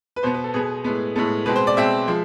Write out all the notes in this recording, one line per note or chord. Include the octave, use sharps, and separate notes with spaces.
B4
B2 B3 C5
B4
A4
B2 B3 G#4
A2 G#3 B3
A2 G#3 B3 A4
B2 G#3 C4 B4
C5
D5
B2 G#3 C4 E5
F3 G#3